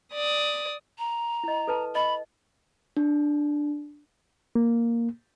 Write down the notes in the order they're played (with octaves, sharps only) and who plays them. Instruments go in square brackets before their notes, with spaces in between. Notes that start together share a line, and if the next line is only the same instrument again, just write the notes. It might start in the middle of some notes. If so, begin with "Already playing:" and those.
[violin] D5 D#6
[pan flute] A#5
[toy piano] E4 D#5
A4 B4 A5
[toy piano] D#5 [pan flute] B5
[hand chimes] D4
[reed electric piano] A#3